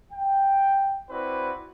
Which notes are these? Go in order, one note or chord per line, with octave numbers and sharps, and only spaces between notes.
G5
C4 E4 F#4 B4 D5